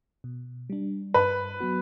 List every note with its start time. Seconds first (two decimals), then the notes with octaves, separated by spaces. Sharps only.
0.24 B2
0.70 G3 D4
1.14 G2 B4
1.60 F#3 B3 F#4